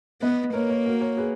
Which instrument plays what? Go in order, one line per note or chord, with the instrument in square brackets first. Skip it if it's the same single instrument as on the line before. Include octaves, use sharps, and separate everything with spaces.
[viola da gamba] B3 [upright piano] B4 D#5
[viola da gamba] A#3 [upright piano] A#4 C#5
[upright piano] A#4 C#5
F#4 A#4
A#4 C#5
G#4 B4